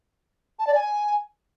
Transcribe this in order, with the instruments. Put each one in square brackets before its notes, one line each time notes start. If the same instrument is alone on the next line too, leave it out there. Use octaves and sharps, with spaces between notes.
[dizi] A5
D5
G#5